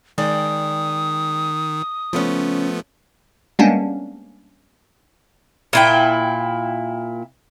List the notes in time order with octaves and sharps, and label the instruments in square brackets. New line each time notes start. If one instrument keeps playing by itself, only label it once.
[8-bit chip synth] D#3 [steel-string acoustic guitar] G#3 D5 G5 [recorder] D#6
[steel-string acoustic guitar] C#3 C#4 [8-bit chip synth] F3 A3 B3
[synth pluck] G3 G#3 A#3 B3 C#4 D4
[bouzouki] A#2 E4 G5